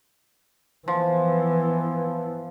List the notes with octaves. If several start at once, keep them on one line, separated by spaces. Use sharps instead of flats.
E3 F3 B3